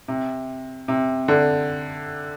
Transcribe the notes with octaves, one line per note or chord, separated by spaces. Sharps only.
C3
C3
D3